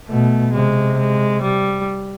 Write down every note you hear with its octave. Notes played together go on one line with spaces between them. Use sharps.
B2 A3
C3 G#3
G#3
G3